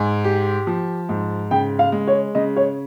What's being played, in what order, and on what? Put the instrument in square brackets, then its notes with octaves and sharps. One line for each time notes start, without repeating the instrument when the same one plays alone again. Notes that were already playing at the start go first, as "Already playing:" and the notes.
Already playing: [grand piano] G#2 [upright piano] G#5
[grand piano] G4
F3
G#2
[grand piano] C#3 [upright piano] G5
[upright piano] F5
[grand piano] G#3
[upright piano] C#5
[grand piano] C#3 [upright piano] D#5
[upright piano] C#5